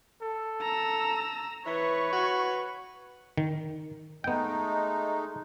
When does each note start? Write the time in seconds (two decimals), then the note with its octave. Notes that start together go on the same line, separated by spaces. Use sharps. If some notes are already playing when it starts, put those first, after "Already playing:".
0.22 A4
0.62 A#5 E6
1.66 E3 B4 C#5 C#6
2.12 F#4
3.37 D#3
4.24 G#3 A3 B3 D#4 G5